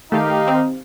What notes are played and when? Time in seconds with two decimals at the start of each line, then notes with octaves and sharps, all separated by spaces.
0.12 D#3 A3 D#4 G4 A4 F5
0.48 C4